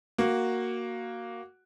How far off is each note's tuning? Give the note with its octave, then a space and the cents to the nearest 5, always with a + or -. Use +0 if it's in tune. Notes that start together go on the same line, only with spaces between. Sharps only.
A#3 +0 F#4 +0 F#5 +0